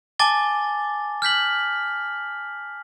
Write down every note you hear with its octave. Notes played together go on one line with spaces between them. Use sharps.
G#5 A5 D6 A6 G7
F6 G6 B6 F#7